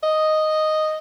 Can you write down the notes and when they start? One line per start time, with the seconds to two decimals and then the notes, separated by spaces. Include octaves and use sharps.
0.03 D#5